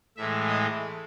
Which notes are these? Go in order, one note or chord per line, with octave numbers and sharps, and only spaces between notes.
A2 E3 G#3 E5
D#5